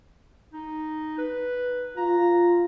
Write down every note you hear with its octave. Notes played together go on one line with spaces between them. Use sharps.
D#4
B4
F4 A#5